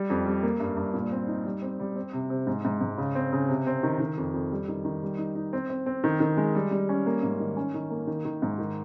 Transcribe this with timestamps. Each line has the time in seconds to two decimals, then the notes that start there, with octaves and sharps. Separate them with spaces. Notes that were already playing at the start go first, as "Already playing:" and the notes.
Already playing: G3
0.10 F2
0.26 G3
0.43 A#3
0.60 G2
0.77 G2
0.94 A#2
1.12 C4
1.28 D#4
1.46 G3
1.62 C4
1.80 G3
1.96 C4
2.13 C3
2.30 C3
2.47 G#2
2.65 G#2
2.81 G#2
2.98 C#3
3.15 C4
3.33 C#3
3.48 C3
3.67 C4
3.83 D#3
4.00 D#3
4.18 F2
4.34 F2
4.52 G3
4.68 D#3
4.85 D#3
5.03 G3
5.19 D#4
5.35 D#4
5.53 C4
5.70 C4
5.86 C4
6.04 D#3
6.20 D#3
6.37 G#3
6.55 G3
6.71 G3
6.89 C#4
7.06 A#3
7.23 G#2
7.40 D#3
7.57 C#4
7.74 D#3
7.90 A#3
8.07 D#3
8.25 D#3
8.42 G#2
8.59 D#3